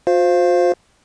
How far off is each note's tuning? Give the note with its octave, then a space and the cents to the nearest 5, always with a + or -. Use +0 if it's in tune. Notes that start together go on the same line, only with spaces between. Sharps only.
F4 +45 C5 +0 F5 -10